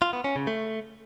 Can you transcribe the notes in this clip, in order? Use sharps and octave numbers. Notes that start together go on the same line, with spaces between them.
F4
B3
C#4
C#3
A3